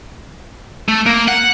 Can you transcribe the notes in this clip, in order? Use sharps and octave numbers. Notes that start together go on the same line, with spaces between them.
A3
A#3
F#5